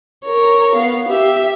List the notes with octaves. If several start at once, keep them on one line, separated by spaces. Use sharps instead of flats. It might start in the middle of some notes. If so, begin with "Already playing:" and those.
A#4 C#5
B3 F5
G4 E5